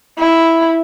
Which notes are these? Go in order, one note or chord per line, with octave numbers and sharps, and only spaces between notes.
E4